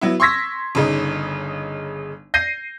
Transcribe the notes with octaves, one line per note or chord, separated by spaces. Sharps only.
F#3 B3 E4
C6 C#6 E6 G#6 A#6 B6
G1 C#3 D#4
G6 A#6 C7 D#7